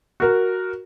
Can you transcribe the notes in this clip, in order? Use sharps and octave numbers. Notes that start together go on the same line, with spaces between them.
F#4 A#4